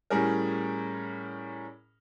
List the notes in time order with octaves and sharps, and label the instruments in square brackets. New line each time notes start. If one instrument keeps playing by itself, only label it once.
[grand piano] A2 G3 C#4 G#4 A#4